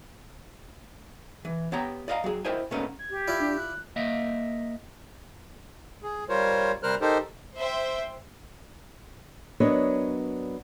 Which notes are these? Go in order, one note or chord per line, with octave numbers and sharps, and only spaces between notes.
E3
B3 G4 C#5 G5 A#5
D5 D#5 F5 F#5 A#5
F#3 G#4
E4 A#4 C5 D#5 G5 G#5
A#2 A3 B3 C#4 D#4 A#4
G#6
G4
E4 F4 D5
D4
F#6
A#3 D#5 E5
G#4
G3 F4 A#4 C5 C#5
C3 G3 A#4 C5 F6 F#6
D#4 G4 A4 A#4 C5
C5 E5 G5
F#3 B3 D4 A#4 C#5 D#5